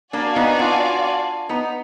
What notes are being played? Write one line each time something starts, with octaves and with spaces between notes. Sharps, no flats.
A#3 D4 F#4 D5 F5 G#5
B3 D#4
D4 F4
B3 D#4